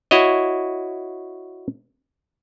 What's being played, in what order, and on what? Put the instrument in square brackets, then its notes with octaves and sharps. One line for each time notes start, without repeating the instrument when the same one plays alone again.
[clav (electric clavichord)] E4 F#4 C#5 D#5